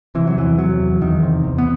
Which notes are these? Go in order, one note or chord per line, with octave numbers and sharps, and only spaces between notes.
C3 E3
F#3
E2 E3
C3 F#3
E2
E2 D#3
C3
E2
B3